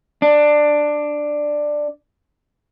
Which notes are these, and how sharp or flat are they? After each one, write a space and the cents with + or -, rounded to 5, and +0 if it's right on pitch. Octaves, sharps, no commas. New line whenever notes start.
D4 +10